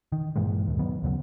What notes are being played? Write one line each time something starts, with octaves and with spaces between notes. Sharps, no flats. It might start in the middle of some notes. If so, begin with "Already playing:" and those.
D#3
G2 A#2 E3 G#3
D#2 G#2
D#3 F#3 B3
D#2 C#3 F#3